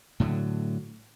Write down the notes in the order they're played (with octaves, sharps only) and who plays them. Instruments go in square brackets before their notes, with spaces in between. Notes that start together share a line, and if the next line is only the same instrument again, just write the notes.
[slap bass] A2 D3 F#3